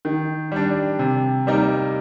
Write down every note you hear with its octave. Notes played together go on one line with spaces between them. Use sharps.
D#3
G3 D4
C3
G3 A#3 D#4 A#4